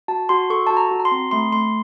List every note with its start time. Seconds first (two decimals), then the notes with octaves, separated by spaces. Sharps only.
0.08 F#4 A5
0.29 F#4 C6
0.50 A4 C#6
0.67 F#4 A5
0.77 A#5
0.91 F#4
1.00 A#5
1.05 C6
1.12 C4
1.31 A3 C6
1.52 A3 C6